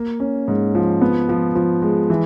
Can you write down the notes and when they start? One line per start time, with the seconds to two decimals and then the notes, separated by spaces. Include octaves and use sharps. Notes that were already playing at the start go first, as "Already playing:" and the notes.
Already playing: A#3
0.20 C#4
0.48 G#2
0.75 F3
1.02 B3
1.29 F3
1.55 F3
1.82 G#3
2.10 E3